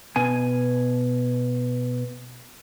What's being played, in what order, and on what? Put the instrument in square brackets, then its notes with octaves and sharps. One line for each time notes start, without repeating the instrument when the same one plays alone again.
[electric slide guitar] B2 G#5